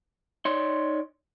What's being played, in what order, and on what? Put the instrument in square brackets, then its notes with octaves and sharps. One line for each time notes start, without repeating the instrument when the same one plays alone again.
[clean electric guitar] D#4 C#5 D5 C6